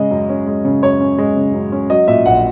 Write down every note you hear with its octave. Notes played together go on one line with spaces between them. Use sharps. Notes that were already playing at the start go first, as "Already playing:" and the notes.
Already playing: C#3 G#3 D#5
F#2
C#4
G#3
C#3
F#2 C#5
C#4
G#3
C#3
F#2
C#4
F#3 D#5
A#2 E5
A#1 F#5